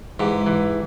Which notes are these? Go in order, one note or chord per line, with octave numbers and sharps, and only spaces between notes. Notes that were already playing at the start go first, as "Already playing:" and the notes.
G#2 E3 G4
E3